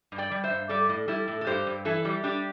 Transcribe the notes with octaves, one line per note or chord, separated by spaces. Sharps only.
G2
D5 G5
G3
C5 E5
G2
G3 A4 D5
A2
G3 E4 A4
A2
A4
G2 G4 C5
G2
E3 E4 A4
G3
G3 D4 G4